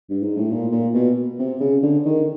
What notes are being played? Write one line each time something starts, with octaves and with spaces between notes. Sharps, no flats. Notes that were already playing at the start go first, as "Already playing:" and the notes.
G2
G#2
A2
A#2
A#2
B2
C3
C#3
D3
D#3